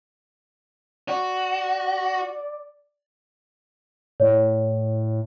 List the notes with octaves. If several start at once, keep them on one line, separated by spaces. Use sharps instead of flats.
F#4 D5
A2 C#5 D5